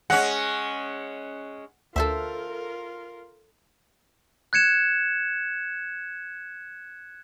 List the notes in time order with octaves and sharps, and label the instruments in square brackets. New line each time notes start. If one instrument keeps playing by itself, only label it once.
[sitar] G#3 C#4 [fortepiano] F#5
[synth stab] D2 [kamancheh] F4 A#4 [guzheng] A4 C5 E5
[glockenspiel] F#6 G#6 C#7 E7